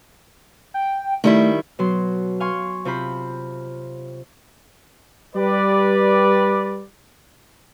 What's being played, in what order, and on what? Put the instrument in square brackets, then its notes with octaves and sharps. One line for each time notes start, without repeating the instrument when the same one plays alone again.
[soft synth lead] G5
[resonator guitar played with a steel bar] D#3 G3 E4 [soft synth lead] A3
[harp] B2 F#3 C6
F5 G#5 C6 C#6
C3 F4 C5 B5
[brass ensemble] G3 B4 D5